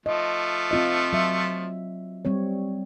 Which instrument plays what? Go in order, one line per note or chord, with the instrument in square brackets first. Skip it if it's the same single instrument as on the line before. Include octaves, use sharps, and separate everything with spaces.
[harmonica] F3 A3 [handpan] D#5
[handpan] C4 F4 D#5
F#3 E5
G3 C4 C#5